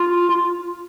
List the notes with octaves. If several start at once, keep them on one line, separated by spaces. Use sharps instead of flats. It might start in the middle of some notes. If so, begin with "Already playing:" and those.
Already playing: F4
F4